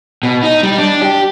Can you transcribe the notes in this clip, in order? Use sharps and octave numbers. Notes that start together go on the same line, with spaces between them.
B2
D#4
G3
D4
G4